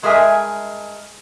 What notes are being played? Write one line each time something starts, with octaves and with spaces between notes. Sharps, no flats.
G2 G#3 G#4 A#4 E5 G#5